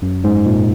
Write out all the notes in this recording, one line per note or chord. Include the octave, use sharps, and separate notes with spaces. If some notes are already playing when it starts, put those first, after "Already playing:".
F#2
G#2
A#2